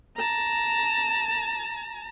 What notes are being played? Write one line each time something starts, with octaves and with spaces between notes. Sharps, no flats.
A5 A#5